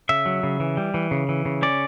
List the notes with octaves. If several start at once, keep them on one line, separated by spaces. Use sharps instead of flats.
C#3 E5
F#3
C#3
E3
G3
E3
C#3
E3
C#3
C#4 D5